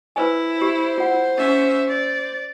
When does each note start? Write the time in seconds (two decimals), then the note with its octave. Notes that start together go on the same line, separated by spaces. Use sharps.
0.16 E4 B4 C5 G#5
0.61 G4 C5
0.98 F4 F#5
1.38 C#4 E5
1.89 D5